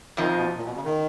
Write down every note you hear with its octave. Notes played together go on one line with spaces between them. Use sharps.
F2 D#3 F3 D#4
B2
A#2
B2
C#3
D#3